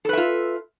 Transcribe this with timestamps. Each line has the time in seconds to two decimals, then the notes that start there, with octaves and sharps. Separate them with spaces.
0.05 A4
0.09 B4
0.13 E5
0.17 F4